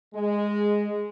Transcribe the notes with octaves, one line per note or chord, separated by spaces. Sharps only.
G#3